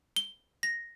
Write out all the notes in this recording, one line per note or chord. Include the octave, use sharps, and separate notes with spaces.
G7
A#6